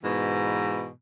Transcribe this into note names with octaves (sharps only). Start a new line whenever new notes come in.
G#2 B2 E3